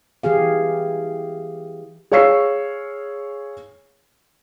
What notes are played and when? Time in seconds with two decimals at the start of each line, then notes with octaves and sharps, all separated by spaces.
0.23 E3 G4 G#4 F5
2.11 G#4 C#5 F5 C#6 E6 C7